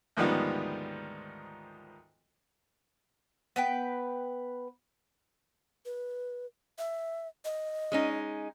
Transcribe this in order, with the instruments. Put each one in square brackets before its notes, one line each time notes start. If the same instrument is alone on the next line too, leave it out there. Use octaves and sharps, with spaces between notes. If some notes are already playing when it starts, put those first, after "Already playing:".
[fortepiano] D2 G#2 D#3 F3 G3 B3
[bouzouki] B3 B4 G5
[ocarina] B4
E5
D#5
[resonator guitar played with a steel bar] G#3 C#4 D#4